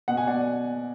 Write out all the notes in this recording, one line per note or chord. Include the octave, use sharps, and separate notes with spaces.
B2 F#5
G#5
D5 F#5